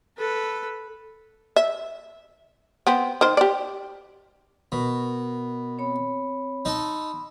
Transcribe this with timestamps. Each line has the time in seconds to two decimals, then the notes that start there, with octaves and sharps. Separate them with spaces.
0.18 A4 B4
1.56 E5
2.87 B3 C4
3.21 D#3 C5
3.37 G4 D5
4.72 B2 A#4 B5
5.78 C4 C#5 B5
6.65 D#4 A4 B5 C6 D#6